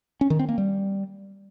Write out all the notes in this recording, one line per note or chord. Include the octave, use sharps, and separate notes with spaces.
C#4
D#3
C4
A#3
G3